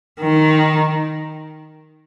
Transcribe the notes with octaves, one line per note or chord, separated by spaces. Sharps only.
D#3